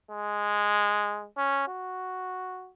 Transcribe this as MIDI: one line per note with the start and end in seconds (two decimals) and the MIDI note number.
0.11 1.26 56
1.38 1.67 61
1.68 2.70 66